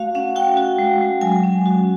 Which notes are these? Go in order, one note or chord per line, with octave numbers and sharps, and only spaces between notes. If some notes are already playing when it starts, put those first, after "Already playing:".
Already playing: A3 F#4 F5
C#4 F#5
F#4 G5
F#4
G#3
G#3
F#3 G#5
C#4
F#4